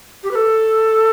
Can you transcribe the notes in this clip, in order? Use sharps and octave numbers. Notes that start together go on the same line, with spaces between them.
G4
B4
A4